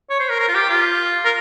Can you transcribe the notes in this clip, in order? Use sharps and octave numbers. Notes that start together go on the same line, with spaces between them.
C#5
C5
A#4
A#4
F4
G4
F4
A#4